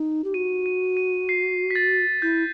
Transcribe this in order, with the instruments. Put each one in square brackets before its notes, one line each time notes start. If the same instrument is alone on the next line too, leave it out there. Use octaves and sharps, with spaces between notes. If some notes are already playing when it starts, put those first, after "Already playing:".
Already playing: [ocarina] D#4
G4
[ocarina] F#4 [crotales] D#7
[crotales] D#7
D#7
C7
B6
A6
[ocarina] E4 [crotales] G6